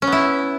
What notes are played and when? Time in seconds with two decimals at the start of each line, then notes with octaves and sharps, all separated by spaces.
0.02 C#4
0.07 B3
0.12 E4